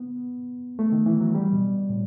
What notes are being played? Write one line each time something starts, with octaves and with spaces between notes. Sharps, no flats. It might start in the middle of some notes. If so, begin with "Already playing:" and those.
Already playing: B3
A3
D#3
E3
F#3
G3
B2
A2